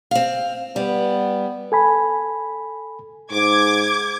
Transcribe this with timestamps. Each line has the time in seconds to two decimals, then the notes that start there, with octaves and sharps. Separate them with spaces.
0.11 C4 F5
0.76 G3 B3
1.72 A4 G#5 B5
3.32 G#2 D6 G#6